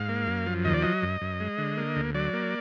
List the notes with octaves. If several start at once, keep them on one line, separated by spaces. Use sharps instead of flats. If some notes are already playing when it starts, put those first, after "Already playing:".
Already playing: G#2 F5
A#3
F#2
F3
D#2 D#5
D5
F#3 D#5
F#2
F#2
G#3
D3
A#3
D2
F#3 D5
A#3